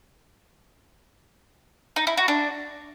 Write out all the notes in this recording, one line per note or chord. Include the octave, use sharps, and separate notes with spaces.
D#4
E4
F#4
D4